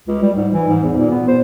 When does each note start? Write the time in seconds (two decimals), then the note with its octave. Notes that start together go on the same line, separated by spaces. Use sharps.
0.07 C#2
0.22 G3
0.37 G#2
0.53 E3
0.68 G#2
0.83 E2
0.97 A#2
1.10 B3
1.28 C5